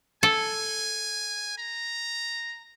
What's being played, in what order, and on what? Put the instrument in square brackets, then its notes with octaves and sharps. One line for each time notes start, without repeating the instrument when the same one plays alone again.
[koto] A4 [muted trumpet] G#5
[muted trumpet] A#5